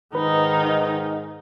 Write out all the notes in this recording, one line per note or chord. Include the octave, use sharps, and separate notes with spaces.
G#2 D#3 D#4 B4